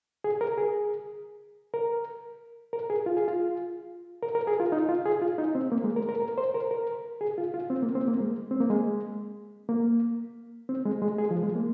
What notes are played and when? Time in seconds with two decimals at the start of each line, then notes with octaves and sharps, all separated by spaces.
0.24 G#4
0.41 A#4
0.58 G#4
1.74 A#4
2.73 A#4
2.90 G#4
3.06 F4
3.17 G#4
3.28 F4
4.23 A#4
4.35 A#4
4.47 G#4
4.60 F4
4.72 D#4
4.89 F4
5.06 G#4
5.22 F4
5.38 D#4
5.55 C4
5.72 A#3
5.84 G#3
5.96 A#4
6.09 A#4
6.22 A#4
6.38 C5
6.54 A#4
6.71 A#4
7.21 G#4
7.38 F4
7.54 F4
7.70 C4
7.83 A#3
7.95 C4
8.08 A#3
8.20 G#3
8.51 C4
8.60 A#3
8.70 G#3
9.69 A#3
10.69 C4
10.85 G#3
11.02 G#3
11.18 G#4
11.31 F3
11.43 G#3
11.56 A#3